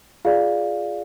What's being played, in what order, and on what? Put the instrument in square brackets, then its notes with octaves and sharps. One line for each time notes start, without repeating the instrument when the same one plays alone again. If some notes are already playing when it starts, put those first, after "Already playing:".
[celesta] F4 G#4 D5 F5